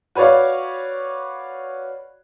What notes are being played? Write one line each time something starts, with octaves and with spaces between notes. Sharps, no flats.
F#4 B4 C#5 D5 F5